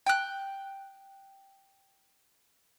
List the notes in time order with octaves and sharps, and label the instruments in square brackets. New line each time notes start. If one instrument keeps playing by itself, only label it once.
[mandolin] G5 F#6